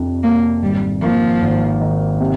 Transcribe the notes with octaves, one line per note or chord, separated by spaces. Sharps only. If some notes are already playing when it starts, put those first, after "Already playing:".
Already playing: F2 C3 D4
C3 A#3
G#1 G3
F3 A#3
G#1
D#3
C3